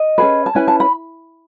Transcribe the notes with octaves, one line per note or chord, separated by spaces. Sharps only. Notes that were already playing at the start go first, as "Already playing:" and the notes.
Already playing: D#5
C#4 G#4 B4
A5
C#4 E4 B4 G#5
A5
B5